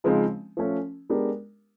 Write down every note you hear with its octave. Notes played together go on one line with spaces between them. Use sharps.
C#3 F3 G#3 C4 D#4
F3 A3 C#4
G#3 B3 D4 G4 A#4